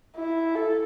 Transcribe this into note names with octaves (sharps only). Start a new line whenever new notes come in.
E4
A4